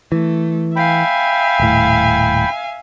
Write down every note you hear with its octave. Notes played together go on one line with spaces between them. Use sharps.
E3 A3
E5 F5 G5 G#5 B5
D#1 A2